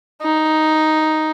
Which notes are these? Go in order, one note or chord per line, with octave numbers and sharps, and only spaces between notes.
D#4